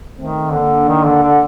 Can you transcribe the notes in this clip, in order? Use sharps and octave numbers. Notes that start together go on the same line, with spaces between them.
D#3 A3 C4
D3 A#3 D4
D#3
D3
D3